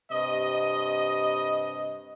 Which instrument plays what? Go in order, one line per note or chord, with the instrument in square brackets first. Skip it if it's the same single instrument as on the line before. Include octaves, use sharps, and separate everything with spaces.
[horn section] G2 C3 D#5